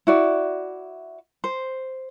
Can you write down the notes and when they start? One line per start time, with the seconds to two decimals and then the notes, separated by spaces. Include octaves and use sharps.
0.07 E4 F#4 D5
1.44 C5